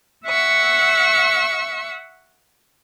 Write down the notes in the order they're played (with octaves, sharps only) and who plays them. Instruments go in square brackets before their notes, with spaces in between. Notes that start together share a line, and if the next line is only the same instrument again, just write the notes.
[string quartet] E5 F#5 C#6 E6